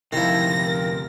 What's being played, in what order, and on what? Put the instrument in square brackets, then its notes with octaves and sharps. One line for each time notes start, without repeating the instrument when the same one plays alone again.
[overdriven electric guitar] D2 C3 [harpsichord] D#3 F3 [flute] E4 [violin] A#6
[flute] A#4